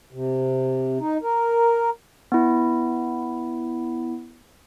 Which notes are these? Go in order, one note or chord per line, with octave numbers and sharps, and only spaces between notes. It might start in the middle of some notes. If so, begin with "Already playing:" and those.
C3
D#4
A#4
B3 E4